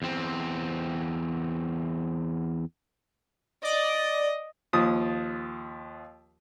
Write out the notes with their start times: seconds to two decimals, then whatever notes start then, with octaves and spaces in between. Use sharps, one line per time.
0.02 E2 C4
3.64 D5 D#5
4.73 D#2 F3 D#6